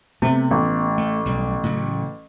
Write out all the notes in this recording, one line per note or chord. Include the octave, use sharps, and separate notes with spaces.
C3 A3 B3
A1
A3
B1 G3
A2 C#3 F#3